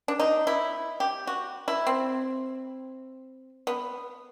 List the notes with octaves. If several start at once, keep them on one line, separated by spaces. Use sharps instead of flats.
D4
D#4
E4
G4
F#4
E4
C4
B3